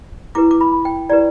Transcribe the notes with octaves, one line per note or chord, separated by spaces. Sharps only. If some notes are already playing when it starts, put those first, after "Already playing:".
E4 G4 B4 D6
D6
B5
G5
E4 G4 B4 D5